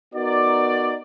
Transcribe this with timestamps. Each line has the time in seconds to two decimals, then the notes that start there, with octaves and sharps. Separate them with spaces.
0.15 B3 D#4 F#4 A#4 D5